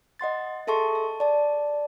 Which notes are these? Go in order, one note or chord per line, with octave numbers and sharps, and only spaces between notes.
D#5 F#5 C6 A6
G#4 A4 E5 A5 C6 C#6
A5
D5 A5